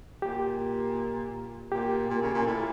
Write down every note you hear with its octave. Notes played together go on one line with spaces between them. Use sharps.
A#2 G4
A#2 G4
A#2
C#3
A#2
A2 A4